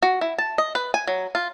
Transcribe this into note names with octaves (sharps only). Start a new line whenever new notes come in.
F#4
E4
A5
D#5
B4
G#5
F#3
F4